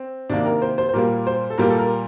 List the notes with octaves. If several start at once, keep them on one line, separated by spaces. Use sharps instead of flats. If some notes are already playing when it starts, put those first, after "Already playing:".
Already playing: C4
C3 D#3 A#3 D4
A#4
C5
C5
C5
A#2 G3 A#3 A#4
C5
A4
A#2 G3 A#3 A#4
A4
A#4